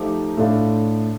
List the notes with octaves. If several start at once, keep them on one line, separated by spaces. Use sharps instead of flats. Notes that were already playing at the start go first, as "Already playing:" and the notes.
Already playing: F3 A3 D#4 G4
A2 A3 D4 F4